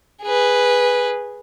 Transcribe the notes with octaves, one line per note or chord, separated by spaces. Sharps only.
G#4 B4